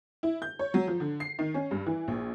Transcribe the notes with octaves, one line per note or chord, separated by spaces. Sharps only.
E4
G6
C#5
F#3
F3
D3
C7
D#3
C#4
G2
E3
A#1